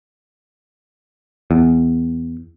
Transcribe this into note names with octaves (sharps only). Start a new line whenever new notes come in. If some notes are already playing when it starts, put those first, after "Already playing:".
E2